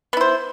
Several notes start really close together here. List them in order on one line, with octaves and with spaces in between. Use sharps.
B3 E4 C5